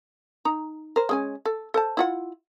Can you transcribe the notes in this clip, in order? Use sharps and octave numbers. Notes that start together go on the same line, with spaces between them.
D#4 A#5
A#4 C5
G#3 C#4 G#5
A4
A4 C5 A5
E4 F4 F#5